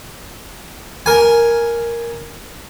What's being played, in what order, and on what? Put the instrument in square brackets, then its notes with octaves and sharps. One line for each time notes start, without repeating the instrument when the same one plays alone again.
[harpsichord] A#4 G#5